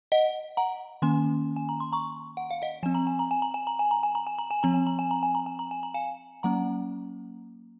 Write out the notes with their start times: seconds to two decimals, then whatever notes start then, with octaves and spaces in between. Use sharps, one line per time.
0.12 D#5 F#5
0.57 F#5 A#5
1.02 D#3 A#3 C#4 G#5 C6
1.56 G#5
1.69 A#5
1.80 C6
1.92 A#5 C#6
2.37 F#5
2.51 F5
2.62 D#5 F#5
2.83 F3 C4 G#5
2.95 A#5
3.07 G#5
3.19 A#5
3.31 G#5
3.42 A#5
3.54 G#5
3.67 A#5
3.79 G#5
3.91 A#5
4.03 G#5
4.15 A#5
4.27 G#5
4.39 A#5
4.51 G#5
4.63 F3 C4 A#5
4.74 G#5
4.87 A#5
4.99 G#5
5.11 A#5
5.23 G#5
5.35 A#5
5.46 G#5
5.59 A#5
5.71 G#5
5.83 A#5
5.94 F5 G#5
6.43 F#3 A#3 C#4 F#5 A#5